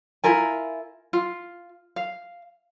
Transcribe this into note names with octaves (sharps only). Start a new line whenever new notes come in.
E4 F4 A#4 G#5
F4
F5